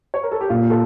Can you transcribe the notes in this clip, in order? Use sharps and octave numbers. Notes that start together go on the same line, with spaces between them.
C#5
A#4
A4
G4
A#2 F4
A4